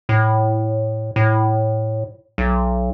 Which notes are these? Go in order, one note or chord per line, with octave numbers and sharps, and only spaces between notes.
A2
A2
B1